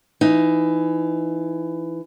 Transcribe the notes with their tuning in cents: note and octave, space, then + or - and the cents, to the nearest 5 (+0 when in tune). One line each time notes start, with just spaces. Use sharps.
E3 +15 D#4 +0